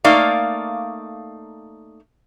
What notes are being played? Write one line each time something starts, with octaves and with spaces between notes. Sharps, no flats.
A3 A#3 D#4 D5 F5